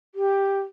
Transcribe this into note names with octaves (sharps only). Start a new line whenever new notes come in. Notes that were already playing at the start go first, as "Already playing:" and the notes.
G4